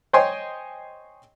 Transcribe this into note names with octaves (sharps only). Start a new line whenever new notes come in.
C5 C#5 D#5 G5 G#5 C6